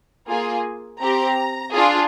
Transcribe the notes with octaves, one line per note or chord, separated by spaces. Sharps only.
A#3 F4 G#4 G#5
C4 G4 A#5
D4 F4 G#4